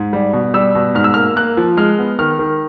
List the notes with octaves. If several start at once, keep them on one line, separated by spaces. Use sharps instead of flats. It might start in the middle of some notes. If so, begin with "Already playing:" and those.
Already playing: G#2
G3
B2
G3 E6
B2
G#2 F6
E6
A#3 F6
A#3 F#6
F3
G#3 F6
B3
D#3 F6
D#3